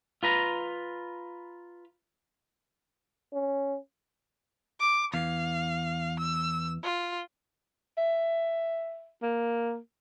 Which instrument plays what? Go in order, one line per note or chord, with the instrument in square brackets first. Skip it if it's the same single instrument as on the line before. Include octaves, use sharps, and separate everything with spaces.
[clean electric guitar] F4 B4 A#5
[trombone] C#4
[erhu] D6
[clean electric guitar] E2 [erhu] F5
[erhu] E6
F4
[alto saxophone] E5
A#3